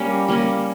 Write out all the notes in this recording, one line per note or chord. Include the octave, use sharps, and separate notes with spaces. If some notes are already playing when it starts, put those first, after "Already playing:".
Already playing: G3 A#3 C#4
G3 A#3 C#4